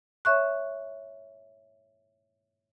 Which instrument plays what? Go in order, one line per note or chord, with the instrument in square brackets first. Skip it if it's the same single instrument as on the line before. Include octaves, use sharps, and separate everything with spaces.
[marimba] C#5 E5 C#6 F#6